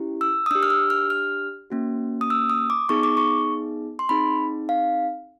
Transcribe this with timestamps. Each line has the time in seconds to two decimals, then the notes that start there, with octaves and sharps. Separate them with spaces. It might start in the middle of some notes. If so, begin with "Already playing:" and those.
Already playing: C#4 E4 G4
0.21 E6
0.46 D#6
0.51 D4 E6
0.55 G4
0.63 F6
0.70 E6
0.90 F6
1.10 F6
1.70 A#3 C#4 F#4
2.21 D#6
2.30 E6
2.50 D#6
2.70 D6
2.89 B3 D#4 G#4 C#6
3.03 D6
3.17 C#6
3.99 C6
4.09 C4 D#4 G#4 B5
4.69 F5